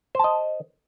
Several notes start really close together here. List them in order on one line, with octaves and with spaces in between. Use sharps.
C5 A5 D#5